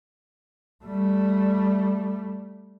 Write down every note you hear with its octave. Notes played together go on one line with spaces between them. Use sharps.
G3 A3